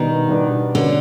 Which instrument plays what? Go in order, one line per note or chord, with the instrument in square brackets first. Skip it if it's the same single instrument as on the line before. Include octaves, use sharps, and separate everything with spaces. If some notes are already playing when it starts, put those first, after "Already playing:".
Already playing: [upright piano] B2 G3 B3 D4 [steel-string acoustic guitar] D#3
[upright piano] B2 G3 B3 D4
[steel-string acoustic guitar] D3 [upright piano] F#3 A#3 C#4